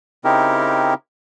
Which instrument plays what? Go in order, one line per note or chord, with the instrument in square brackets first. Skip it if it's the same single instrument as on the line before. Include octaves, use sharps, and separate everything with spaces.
[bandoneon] C#3 C4 D#4 E4 G4 A#4